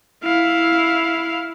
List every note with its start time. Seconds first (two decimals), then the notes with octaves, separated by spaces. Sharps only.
0.24 E4 F5